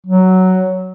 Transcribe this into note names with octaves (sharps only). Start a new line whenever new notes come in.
F#3